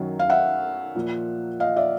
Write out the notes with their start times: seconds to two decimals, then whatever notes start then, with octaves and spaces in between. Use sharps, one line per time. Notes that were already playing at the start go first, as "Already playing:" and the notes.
Already playing: F#2 D#3 F#3
0.19 F5
0.30 E5 F#5
0.95 A#2 F3
1.60 D#5 F5
1.76 D5 E5